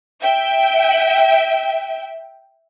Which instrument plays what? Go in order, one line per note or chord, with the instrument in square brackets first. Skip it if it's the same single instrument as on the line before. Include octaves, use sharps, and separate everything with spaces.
[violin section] E5 G5